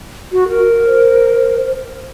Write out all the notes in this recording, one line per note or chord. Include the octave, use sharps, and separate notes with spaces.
F#4
A#4
C5